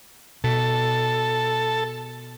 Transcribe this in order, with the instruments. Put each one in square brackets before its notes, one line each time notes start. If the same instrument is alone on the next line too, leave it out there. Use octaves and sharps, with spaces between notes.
[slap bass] B2 [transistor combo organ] A4